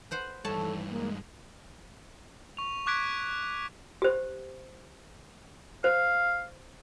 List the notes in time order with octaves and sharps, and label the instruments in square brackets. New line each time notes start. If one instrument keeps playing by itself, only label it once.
[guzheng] B4 C5 F#5
[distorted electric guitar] G2 D#3 [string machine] E3 [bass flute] A4 [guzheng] C#5 A5
[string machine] G#3 [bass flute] A#3
[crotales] C#6 F7
C#6 D6 F#6 G#6 B6 D7
[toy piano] G4 C5
[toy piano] C5 [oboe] F5